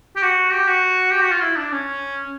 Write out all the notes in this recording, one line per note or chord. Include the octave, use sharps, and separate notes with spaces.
G4
F#4
G4
F#4
G4
F#4
F4
E4
D4
C#4